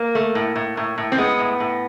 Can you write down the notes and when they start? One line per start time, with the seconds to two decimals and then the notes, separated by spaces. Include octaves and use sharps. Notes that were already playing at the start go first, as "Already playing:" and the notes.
Already playing: A#3
0.15 A3
0.35 A2
0.56 A2
0.77 A2
0.98 A2
1.12 C4
1.18 G#3 B3
1.39 A2
1.60 A2